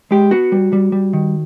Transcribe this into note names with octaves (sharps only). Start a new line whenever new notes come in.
G#3 G4
B3 F#4
G3
G3
G3
D#3